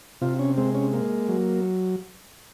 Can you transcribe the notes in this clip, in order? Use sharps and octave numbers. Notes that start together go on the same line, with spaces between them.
C3 F4
C#4
G#3 C4
C#4
A#3
F#3